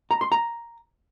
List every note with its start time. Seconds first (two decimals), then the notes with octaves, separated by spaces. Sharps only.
0.11 A#5
0.21 C6
0.32 A#5